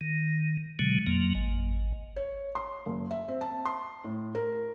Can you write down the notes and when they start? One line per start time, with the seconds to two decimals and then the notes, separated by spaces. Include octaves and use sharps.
0.01 D#3
0.79 B2 D3 F#3 G#3
1.07 F2 F#3 A#3
1.35 G#1
2.16 C#5
2.55 C6
2.86 F#1
3.11 E5
3.28 C4
3.41 A5
3.65 C6
4.04 A2
4.35 A#4